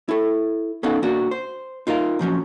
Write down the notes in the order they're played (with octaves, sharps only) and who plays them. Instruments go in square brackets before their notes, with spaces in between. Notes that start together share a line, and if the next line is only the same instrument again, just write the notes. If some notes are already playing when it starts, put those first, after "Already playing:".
[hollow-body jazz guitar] E4 A4
B3 C#4 D#4 A4 F5 F#5
A#2 A#3 D4 F#4
C5
D#4 F4 A#4 F5
A#2 F3 F#3 C#4